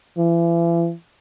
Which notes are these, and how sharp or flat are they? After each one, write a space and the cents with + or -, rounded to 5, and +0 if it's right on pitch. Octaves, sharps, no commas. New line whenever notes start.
E3 +40